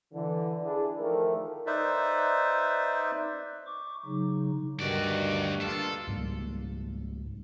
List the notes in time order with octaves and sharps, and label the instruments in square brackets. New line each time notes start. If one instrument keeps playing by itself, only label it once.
[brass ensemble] D3 E3
D4 E4 G#4
D#3 F3 A3 A#4
[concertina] D#4 B4 C5 D5 E5
[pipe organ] C#6 D6
C#3 F#3 D#4
[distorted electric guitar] D2 D5 [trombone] G2 [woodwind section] D#3 F#4
[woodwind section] A#3 D4 F4 [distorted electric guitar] A4
[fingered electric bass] C#2 G#2 G3 A#3